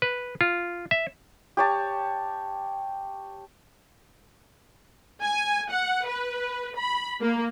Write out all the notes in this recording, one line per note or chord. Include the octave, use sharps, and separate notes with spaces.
B4
F4
E5
G4 C#5 A5
G#5
F#5
B4
B5
A#3